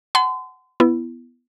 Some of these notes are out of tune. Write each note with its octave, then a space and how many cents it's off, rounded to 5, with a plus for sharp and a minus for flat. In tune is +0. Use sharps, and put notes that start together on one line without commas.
F#5 +10 A5 -45 C6 -35
B3 +0 E4 +20